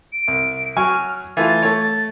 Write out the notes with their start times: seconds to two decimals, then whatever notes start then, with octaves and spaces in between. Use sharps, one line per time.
0.13 D7
0.28 C2
0.77 F#3 G#5 C#6 F6
1.37 E3 A3 F4 A6
1.63 A3 C#5